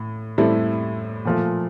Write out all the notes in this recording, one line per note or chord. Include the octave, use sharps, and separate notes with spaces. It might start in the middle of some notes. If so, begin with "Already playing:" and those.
Already playing: A2
A2 G3 C4 E4 A4
A#2 F3 A3